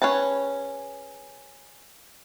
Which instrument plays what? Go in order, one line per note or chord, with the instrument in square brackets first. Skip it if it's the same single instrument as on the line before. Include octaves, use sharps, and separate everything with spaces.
[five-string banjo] C#4 G#4 B4 A5